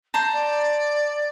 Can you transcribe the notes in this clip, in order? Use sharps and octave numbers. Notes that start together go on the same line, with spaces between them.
A5 A#5 C6 G6
D5